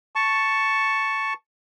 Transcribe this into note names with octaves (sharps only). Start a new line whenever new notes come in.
A5 C#6